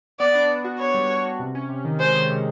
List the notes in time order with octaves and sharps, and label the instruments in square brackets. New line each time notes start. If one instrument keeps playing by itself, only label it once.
[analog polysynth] B3 [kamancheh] D5
[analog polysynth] D4
B3
F#4
[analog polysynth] B3 [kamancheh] C#5
[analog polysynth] G3
F#4
F#4
C3
C#4
C3
D#3
[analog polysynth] G#3 [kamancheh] C5
[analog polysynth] D#3
C3